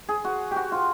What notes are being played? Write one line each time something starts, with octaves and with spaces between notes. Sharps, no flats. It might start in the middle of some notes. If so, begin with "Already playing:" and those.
G#4
F#4
F#4 G4
F4